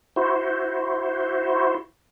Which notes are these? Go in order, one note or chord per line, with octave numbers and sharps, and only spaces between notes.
E4 F#4 C5